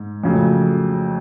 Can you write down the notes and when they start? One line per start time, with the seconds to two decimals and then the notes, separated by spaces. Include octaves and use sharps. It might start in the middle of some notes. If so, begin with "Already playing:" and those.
Already playing: G#2
0.24 F2 C#3 F#3 A3